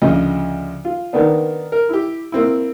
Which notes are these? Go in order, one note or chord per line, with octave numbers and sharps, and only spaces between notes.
D2 C#3 F3 D#5
F4
D#3 A#3 B3 D4
A#4
E4 G4
A#3 C4 E4